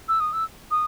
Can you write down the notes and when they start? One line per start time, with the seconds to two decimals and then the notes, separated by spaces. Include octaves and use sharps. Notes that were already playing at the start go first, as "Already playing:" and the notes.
0.09 E6
0.20 D#6
0.33 E6
0.71 D#6